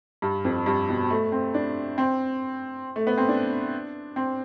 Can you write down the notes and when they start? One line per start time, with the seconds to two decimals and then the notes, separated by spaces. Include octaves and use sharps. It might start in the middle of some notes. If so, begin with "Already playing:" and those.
0.22 G2
0.45 F2
0.66 G2
0.89 B2
1.10 A3
1.32 C4
1.54 D4
1.98 C4
2.96 A3
3.07 B3
3.18 C4
3.29 D4
4.16 C4